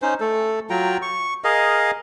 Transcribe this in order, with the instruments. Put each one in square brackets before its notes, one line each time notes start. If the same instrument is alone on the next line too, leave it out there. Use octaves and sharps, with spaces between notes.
[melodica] C#4 D#4 C5
A3 A4
F#3 F4 G5 A#5
C#6
G#4 A#4 D#5 F5